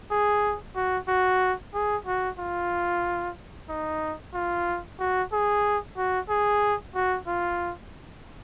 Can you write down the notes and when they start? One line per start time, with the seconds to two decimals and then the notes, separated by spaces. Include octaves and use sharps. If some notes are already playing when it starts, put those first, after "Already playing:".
0.11 G#4
0.75 F#4
1.08 F#4
1.74 G#4
2.07 F#4
2.39 F4
3.69 D#4
4.34 F4
5.00 F#4
5.32 G#4
5.97 F#4
6.29 G#4
6.95 F#4
7.27 F4